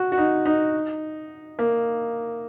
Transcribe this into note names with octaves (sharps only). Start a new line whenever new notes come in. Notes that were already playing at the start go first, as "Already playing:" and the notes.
Already playing: F#4
F#4
D#4
D#4
A#3